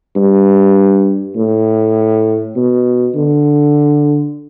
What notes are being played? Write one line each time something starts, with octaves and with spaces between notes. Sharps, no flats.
G2
A2
B2
D3